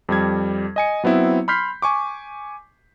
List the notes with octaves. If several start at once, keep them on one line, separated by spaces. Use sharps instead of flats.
F2 G3 G#6
D#5 G#5 C#7
F#3 B3 C4 E4
B5 C6 F6 G6 B6 C7
G#5 C#6 D6